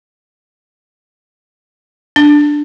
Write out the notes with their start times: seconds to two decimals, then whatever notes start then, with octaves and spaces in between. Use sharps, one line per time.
2.16 D4